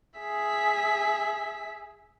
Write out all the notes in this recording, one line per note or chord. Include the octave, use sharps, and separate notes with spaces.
G#4 E5 B6